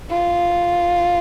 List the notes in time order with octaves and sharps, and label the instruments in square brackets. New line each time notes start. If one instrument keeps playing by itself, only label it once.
[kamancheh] F4